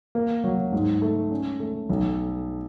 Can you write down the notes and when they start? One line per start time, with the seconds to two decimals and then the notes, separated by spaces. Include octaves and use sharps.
0.15 A#3
0.44 F#3
0.72 G#2
1.02 A3
1.31 C#4
1.60 A3
1.89 B1